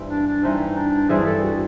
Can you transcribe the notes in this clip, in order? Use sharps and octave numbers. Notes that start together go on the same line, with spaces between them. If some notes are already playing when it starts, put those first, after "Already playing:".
Already playing: G2 E3 G3 C4
D4
D4
G2 E3 G3 C4 D#4
D4
G2 E3 G3 C4 G#4
A4
F#4